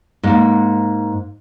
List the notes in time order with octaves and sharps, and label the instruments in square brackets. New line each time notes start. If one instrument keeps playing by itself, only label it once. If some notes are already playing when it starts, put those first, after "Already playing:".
[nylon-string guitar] G#2 A#3